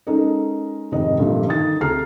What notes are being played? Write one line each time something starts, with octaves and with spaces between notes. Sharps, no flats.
G#3 C#4 D#4 A4 A#4 D#5
F1 G#2 D#3 D#5
G2 A#2 D3 F3 A3
D3 D#3 D#6 A6
D2 C3 G#4 A#5 F6 C7